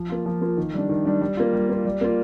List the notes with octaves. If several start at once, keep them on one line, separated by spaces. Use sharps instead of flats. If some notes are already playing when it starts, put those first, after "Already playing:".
Already playing: F3
A#3 F4
F3
A#3 F4
D#3
G3 D4
D#3
G3 D4
G3
A#3 F4
G3
A#3 F4
G3
A#3 F4